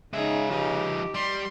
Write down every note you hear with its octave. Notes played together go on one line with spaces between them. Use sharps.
C#3 G#3 D#4 G#4 E5
F3 D#4 G4 B4
G3 C6